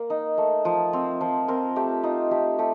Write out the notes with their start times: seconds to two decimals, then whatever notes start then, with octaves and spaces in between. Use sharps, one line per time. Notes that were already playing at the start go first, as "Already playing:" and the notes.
Already playing: A#3 A#4
0.10 D#4
0.38 A3
0.65 F3
0.93 C4
1.21 F3
1.48 C4 A#4
1.76 A3 G4
2.03 D#4 F4
2.31 A3 G4
2.59 A3 G4